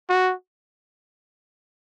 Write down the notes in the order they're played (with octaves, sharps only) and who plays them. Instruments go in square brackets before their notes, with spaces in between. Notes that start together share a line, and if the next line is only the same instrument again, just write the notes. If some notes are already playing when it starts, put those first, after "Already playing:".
[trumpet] F#4